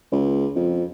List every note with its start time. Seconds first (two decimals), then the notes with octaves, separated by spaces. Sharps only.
0.12 C#2
0.56 F2